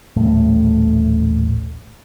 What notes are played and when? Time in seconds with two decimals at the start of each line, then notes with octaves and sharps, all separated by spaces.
0.16 D#1 A1 A2 A3